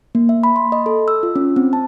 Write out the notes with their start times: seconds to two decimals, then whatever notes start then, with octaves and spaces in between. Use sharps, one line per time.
0.15 A#3
0.29 E5
0.43 B5
0.56 C6
0.72 D#5
0.86 A4
1.08 E6
1.23 F4
1.36 C#4
1.56 C4
1.73 A5